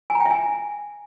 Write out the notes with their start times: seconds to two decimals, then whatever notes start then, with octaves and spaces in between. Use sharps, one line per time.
0.10 G#5
0.15 A#5
0.20 G5
0.26 E5
0.31 G#5